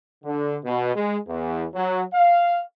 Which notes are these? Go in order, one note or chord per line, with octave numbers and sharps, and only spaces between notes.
D3
B2
G#3
E2
F#3
F5